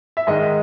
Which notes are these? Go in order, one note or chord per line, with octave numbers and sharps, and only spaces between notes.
E5
G#2 D#3 G#3 D#5